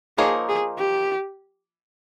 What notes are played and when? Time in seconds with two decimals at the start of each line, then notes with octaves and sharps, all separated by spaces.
0.18 F3 A#3 D#4 G#4 A#4 C#5
0.49 G#4
0.78 G4